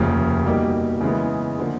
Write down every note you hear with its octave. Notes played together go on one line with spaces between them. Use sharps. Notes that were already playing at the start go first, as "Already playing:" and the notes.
Already playing: F1 D#2 C#3 F3
B2 G3 A#3 D#4 G4
C#3 E3 G#3 B3
D3 F3 A#3